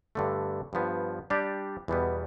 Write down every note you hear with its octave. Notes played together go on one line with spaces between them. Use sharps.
G2 D3 A3
G2 F3 B3
G3 D4 G4 D5
E2 B2 G3 B3